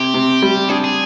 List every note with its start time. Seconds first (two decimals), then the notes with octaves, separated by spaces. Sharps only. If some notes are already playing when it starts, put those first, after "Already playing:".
Already playing: C3 G4
0.14 C3
0.42 G3
0.69 D4 G#4
0.84 G#4